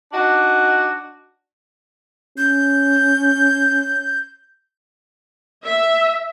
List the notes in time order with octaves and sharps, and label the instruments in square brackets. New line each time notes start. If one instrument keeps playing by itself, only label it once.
[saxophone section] D4 D#4 F#4
[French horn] C#4 [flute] G6
[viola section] E5